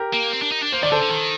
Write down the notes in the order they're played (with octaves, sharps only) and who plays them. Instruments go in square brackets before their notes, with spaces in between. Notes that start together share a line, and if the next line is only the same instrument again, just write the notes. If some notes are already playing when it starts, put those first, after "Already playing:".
Already playing: [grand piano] G4 A#4
[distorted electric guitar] A#3
C4
D4
D#4
D4
[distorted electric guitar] A#3 [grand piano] C5
[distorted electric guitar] D#3 [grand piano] D5
[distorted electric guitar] D3 [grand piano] A4 C5
[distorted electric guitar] D3
D#3